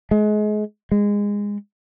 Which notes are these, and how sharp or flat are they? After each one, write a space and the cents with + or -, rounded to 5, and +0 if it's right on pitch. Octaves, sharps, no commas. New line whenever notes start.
G#3 +30
G#3 -20